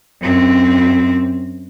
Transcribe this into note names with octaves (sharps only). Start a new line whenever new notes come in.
F#2 C4